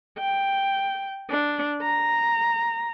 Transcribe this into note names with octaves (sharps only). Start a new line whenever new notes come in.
G5
D4
A#5